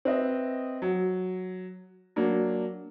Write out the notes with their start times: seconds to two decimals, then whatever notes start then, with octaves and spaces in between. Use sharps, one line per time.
0.05 C4 B4 D#5 E5
0.82 F#3
2.16 F#3 A#3 D4